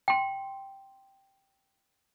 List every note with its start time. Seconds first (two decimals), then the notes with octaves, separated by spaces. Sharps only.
0.08 G5 C6